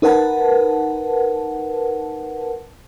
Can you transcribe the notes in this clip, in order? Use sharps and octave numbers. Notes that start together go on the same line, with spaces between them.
D#4 A#4 B4 F#5 A5